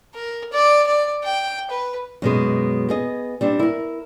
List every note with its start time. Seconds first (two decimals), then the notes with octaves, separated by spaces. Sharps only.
0.15 A#4
0.53 D5
0.87 D5
1.24 G5
1.71 B4
2.22 F#2 B2 G#3
2.89 B3 G#4 D#5
3.41 G3 C4 D4
3.59 E4 A#4